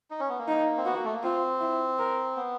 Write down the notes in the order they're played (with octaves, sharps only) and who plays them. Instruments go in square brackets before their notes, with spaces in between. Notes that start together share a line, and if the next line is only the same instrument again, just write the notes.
[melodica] D#4
C#4
B3
A#3
[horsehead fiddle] D#4
[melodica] C4
[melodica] B3 [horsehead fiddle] F#4
[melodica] A#3
A3
A#3
[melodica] C4 [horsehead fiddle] F4
[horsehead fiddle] E4
A#4
[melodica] B3